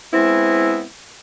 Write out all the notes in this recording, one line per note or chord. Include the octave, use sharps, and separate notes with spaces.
G#3 B3 C4 E4